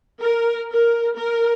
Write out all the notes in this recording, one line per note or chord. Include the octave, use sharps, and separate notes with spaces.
A#4
A#4
A#4